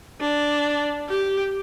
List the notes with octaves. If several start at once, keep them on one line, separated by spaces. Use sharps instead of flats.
D4
G4